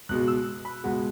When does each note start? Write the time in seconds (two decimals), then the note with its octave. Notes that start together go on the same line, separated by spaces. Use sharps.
0.09 C#2 B2 G#3 F#6
0.28 E6
0.65 B5
0.84 C#2 B2 G#3 F#5